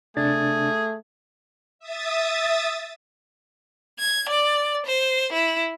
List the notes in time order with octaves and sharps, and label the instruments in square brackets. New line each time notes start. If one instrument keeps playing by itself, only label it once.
[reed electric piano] C3 D4 A6 [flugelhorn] A3 [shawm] G#4
[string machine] E5 D#6 A6
[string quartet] G#6
D5
C5
E4